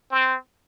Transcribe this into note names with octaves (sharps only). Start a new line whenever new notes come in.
C4